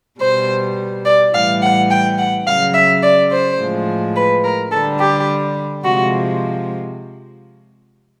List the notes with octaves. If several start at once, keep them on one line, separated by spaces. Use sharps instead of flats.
B2 G3 C5
D5
A2 E3 G3 F5
F#5
G5
F#5
C#3 F#3 F5
E5
D5
C5
A2 F3 G#3
B4
A#4
D3 G3 A4
G4
C3 F3 G#3 F#4